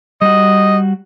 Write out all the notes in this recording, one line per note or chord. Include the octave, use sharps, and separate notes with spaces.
G3 F#4 D#5